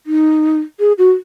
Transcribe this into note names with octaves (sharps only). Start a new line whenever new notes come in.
D#4
G#4
F#4